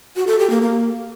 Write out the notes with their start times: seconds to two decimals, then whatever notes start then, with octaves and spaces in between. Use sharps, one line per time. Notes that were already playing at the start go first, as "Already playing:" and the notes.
0.16 F#4
0.27 A4
0.39 G4
0.50 A#3
0.61 A#3